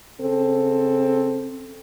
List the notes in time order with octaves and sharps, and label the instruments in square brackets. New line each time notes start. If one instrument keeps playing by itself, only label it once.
[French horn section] C#3 C4 A4